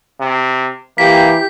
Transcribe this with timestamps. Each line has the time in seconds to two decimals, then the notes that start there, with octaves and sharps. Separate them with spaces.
0.20 C3
0.98 E3 A#3 G4 B6